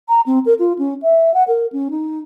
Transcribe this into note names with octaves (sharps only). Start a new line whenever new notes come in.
A#5
C4
A#4
F4
C#4
E5
F#5
A#4
C#4
D#4